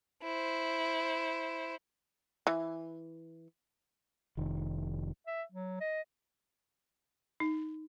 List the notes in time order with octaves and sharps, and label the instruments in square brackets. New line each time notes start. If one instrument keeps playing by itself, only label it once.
[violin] E4 C5
[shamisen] E3
[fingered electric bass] F1 D#3
[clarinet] E5
F#3
D#5
[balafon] D#4